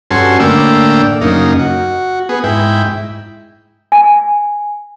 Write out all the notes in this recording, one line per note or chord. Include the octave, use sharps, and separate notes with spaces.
G2 C#4 F#4 A4 G#5 C6
A2 D3 A#3 D5 G5 E6
F#2 C#3 A#3 D#4
F#4
B3 G#4
G#2 E4 G5
G#5